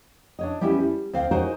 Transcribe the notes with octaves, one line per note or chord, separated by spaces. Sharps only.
D4 C#5 D#5
G3 B3 C#4 E4 G4
G3
D2 C4 F5
D#4 F#4 G#4 A#4 C5 C#5